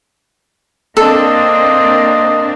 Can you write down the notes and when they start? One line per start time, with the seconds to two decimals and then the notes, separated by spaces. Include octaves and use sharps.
0.97 A#3 C4 D4 A4 D#5